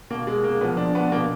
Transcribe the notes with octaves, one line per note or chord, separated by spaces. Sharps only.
B2 A#3
G#3
A#3
A#2 F3 B3
D4
B3
B2 A#3